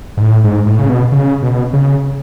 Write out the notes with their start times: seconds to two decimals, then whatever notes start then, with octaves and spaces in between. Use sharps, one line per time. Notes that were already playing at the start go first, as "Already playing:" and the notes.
0.17 G#2
0.22 A2
0.44 G#2
0.66 A2
0.79 C#3
0.89 B2
1.12 C#3
1.42 B2
1.73 C#3